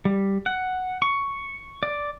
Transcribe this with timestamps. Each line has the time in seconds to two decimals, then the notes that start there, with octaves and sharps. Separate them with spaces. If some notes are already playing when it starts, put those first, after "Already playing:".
0.05 G3
0.46 F#5
1.02 C#6
1.83 D5